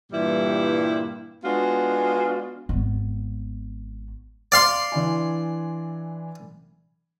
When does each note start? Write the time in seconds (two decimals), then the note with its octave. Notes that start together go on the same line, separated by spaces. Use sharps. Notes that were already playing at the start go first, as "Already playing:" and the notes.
0.12 G2 A#2 E3 G3 E4
1.45 G#3 B3 D4 F4 F#4
2.69 G#1 B3
4.52 D5 F5 C6
4.92 E3 D4 G#5